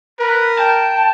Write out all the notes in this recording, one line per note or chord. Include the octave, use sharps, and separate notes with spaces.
A#4 B4
G5 A5